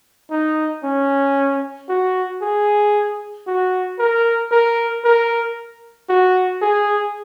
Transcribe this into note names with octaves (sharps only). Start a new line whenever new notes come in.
D#4
C#4
F#4
G#4
F#4
A#4
A#4
A#4
F#4
G#4